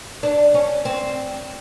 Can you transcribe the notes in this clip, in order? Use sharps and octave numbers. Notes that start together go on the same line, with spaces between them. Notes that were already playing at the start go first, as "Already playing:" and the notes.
D4
C#4
C4